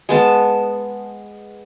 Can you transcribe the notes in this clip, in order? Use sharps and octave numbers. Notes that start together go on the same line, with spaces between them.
G#3 B3 A5